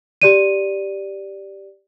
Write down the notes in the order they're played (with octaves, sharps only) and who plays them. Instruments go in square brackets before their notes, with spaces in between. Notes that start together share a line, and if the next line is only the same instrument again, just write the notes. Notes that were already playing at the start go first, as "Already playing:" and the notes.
[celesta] G4 D5 D#7